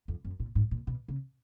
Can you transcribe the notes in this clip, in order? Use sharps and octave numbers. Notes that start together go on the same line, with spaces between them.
F2
F#2
A#2
G#2
A#2
B2
C#3